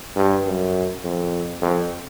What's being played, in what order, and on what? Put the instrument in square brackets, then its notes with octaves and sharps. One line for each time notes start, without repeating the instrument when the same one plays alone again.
[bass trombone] G2
F#2
F2
F2